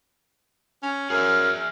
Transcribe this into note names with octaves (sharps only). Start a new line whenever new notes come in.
C#4
F#2 G#4 E5 F6